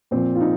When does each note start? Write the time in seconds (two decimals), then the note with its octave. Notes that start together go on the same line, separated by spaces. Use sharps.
0.11 A#2 F3 C4
0.35 F4
0.41 D#4